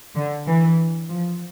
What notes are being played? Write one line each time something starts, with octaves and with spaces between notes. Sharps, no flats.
D3
E3
F3